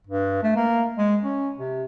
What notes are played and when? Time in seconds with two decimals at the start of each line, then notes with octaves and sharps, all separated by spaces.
0.07 G2
0.43 A3
0.56 A#3
0.98 G#3
1.23 C#4
1.58 C3